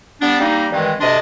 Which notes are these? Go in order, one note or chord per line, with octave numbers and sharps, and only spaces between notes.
G3 B3 D4
G3 A#3 C4 D#4
G2 D#3 E3 G#3 C4
D2 C3 D4 D#5 C6